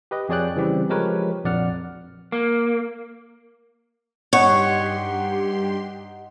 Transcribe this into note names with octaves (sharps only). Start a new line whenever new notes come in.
G4 B4 D#5
F2 G#4 C#5 D5 G5 F#6
C#3 E3 G3 C4 G4
F3 G#3 G4 A#4 B4 C#5
A#1 F2 D5 F#5 F6
A#3
G2 D#4 G4 C#5 F#5 C6 D#6